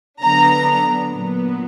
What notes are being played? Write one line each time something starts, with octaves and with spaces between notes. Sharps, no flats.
D3 F#3 B3 D4 A#5
A#2 F#3 B3